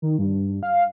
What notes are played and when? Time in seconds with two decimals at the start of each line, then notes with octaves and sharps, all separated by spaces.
0.02 D#3
0.18 G2
0.63 F5